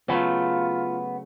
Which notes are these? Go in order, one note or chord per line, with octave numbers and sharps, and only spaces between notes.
C#3 F#3 A3 B3 F4